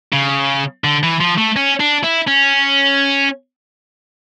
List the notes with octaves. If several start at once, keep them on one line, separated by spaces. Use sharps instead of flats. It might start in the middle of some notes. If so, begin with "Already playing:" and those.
C#3
D3
E3
F3
A3
C#4
D4
E4
C#4